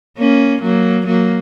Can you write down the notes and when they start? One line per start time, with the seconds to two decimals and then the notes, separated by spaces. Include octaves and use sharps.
0.18 A#3 C#4
0.62 F#3 A#3
1.06 F#3 A#3